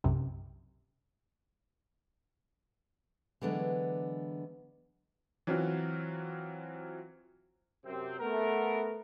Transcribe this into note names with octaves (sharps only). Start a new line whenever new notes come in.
B1 F#2 C3
D3 E3 F#3 G#3 B3 D4
E3 F#3 C4 F4 F#4
F#2 C3 C4
A3 B3 A#4